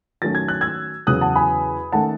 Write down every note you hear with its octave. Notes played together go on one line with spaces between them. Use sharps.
D#3 F#3 A3 C#4 A6
G#6
F#6
E6 G#6
E2 C#3 F#3 D#6 F#6
F#5 A5
G#5 B5
D#3 A3 C#4 F#5 A5